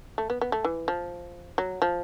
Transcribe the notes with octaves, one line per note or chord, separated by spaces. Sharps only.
A3
B3
B3
A3
E3
F3
F#3
F3